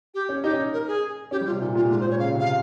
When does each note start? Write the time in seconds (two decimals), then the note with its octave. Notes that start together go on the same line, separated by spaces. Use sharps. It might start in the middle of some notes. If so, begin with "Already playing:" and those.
0.14 G4
0.29 C#4
0.43 D#4 G4
0.53 C#4
0.73 A#4
0.87 G#4
1.31 C#4 G4
1.41 G3
1.46 F4
1.51 C3
1.61 A#2 D#4
1.75 A#2 F4
1.90 G#2 F4
2.00 C5
2.05 A#2
2.10 C#5
2.19 C#3 F5
2.34 C3
2.39 F5